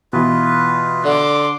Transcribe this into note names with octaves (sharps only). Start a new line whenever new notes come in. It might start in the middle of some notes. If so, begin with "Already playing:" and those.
B2 E3 F4 B4
D3 C6 D6